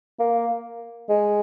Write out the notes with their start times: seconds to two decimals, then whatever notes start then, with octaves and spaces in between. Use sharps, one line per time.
0.19 A#3
1.09 G#3